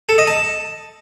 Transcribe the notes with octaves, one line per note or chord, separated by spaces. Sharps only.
A4
D#5
A5